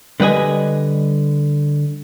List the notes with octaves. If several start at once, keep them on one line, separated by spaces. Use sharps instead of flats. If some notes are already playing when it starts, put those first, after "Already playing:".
D3 G3 B4 D#5 G#5